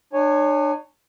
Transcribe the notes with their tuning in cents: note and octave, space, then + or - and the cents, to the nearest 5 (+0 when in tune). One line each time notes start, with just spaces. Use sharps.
D4 +40 C#5 +0 G#5 +0